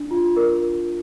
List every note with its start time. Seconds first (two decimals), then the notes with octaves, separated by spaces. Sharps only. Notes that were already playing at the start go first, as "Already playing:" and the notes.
Already playing: D4
0.11 F4
0.37 A#4